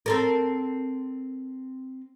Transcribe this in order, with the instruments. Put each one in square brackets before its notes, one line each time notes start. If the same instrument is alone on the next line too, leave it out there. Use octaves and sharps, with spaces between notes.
[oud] C4 A4 A#4